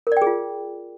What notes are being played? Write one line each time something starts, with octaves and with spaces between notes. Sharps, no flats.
F4 G#4 A#4 D5 G5